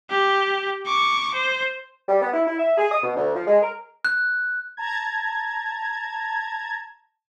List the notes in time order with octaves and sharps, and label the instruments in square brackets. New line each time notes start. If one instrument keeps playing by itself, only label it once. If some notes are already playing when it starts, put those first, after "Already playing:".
[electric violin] G4
C#6 D6
C5
[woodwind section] G3
B3
E4
E4
E5
G#4
D#6
B2
D2
F3
G#3
A#4
[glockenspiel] F#6
[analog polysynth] A5 A#5 G#6